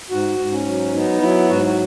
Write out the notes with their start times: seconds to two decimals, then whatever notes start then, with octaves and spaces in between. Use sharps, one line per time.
0.10 G#2 F#4
0.38 G#2
0.51 C#4
0.66 F#3
0.94 B3 D#4
1.21 F#3 E4
1.49 G#2 F#4
1.66 F#4